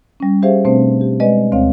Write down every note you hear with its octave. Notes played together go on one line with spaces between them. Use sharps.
G3 C#4
G4 G#4 C5 E5 F5
B2 A3 C4 D4 C5
G4
G#3 B4 D5 D#5
D2 C4 C#5 F5